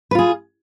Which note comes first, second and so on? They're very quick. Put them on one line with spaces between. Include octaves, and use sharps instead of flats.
B4 F4 G#4